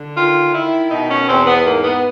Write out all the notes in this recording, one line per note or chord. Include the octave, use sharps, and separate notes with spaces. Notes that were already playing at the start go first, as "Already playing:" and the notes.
Already playing: D3
D#3 F4
D#3 E4
B2 D#4
C#4
E2 C4
B3
G#2 A#3
B3